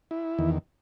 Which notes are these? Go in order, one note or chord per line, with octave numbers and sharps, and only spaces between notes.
E4
E2 D#3